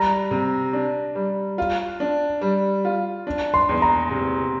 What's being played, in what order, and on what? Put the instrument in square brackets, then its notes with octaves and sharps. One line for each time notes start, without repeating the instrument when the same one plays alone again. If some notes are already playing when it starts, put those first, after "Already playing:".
Already playing: [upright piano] G3 [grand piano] A#5
[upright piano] C3
D4
G3
F4
D4
G3
F4
D4
[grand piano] C6
[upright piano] E2
[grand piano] A#5
[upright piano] C3